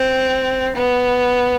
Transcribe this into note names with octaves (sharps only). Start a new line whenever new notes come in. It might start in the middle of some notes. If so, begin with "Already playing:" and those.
Already playing: C4
B3